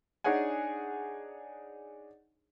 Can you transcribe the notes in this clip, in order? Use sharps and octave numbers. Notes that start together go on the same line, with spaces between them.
D4 D#4 G#4 C#5 F#5 G#5